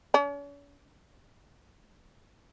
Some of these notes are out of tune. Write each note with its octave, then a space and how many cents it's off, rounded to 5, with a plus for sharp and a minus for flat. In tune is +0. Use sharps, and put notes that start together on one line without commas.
C#4 +45